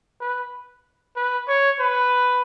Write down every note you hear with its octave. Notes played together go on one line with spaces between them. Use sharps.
B4
B4
C#5
B4